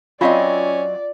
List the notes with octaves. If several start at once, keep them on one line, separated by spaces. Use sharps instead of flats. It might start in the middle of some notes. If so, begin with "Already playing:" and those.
F#3 C4 C#4 F4 D5 D#5 F5